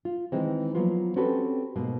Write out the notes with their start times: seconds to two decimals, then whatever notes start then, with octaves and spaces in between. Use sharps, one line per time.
0.05 F4
0.32 D#3 E3 G#3 C4
0.75 F3 F#3 A#3 B3 F4
1.16 C4 C#4 F#4 G4 A4 B4
1.76 G#2 B2 A#3